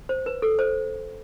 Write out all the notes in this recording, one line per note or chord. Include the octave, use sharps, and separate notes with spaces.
C5
B4
A4
C5